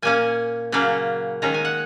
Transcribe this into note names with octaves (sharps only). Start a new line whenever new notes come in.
A#2 A#3 C#4 G#5
C#3 F#3 A#3 C#4
D#3 G#3 C#4 A#5
G#5
F#5